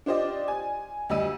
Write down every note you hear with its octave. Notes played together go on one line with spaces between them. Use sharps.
D4 F4 G4 C5 D5 D#5
G#5
D2 G3 D#5 E6 D#7